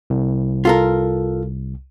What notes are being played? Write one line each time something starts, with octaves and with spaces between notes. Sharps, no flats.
C2
F4 A4 A#4